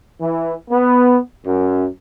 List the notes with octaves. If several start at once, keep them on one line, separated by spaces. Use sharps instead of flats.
E3
B3
F#2